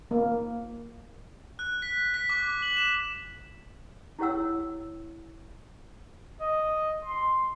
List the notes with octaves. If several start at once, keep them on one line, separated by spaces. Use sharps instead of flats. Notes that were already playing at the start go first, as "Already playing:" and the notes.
A#3
F#6
B6
B6
D6
F#7
E7
E4 G4 C#5 F#5 E6
D#5
C6